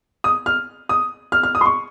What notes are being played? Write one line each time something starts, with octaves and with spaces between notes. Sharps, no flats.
D#6
F6
D#6
F6
F6
D#6
C6
C#6